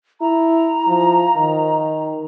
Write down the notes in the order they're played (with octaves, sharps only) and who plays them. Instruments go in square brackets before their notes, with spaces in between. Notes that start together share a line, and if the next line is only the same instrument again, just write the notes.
[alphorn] E4 [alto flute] A#5
[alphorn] F3
D#3